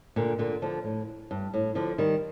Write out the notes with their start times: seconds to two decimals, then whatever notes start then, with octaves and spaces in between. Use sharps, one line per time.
0.16 A#2 D3
0.39 A#2 D3
0.62 D3 F3
0.85 A2
1.31 G2
1.54 A2
1.75 D3 F3
1.98 D#3 G3